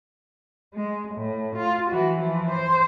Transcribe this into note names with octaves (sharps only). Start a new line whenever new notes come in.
G#3
A2
F4
E3 F#4
E3 F3
C5